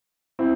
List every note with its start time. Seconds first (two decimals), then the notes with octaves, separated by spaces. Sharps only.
0.39 C4 E4